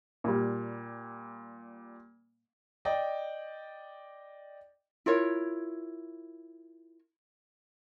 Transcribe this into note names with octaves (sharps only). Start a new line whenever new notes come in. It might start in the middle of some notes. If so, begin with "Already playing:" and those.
A#2 G3
D5 D#5 G5
E4 F4 A#4 C#5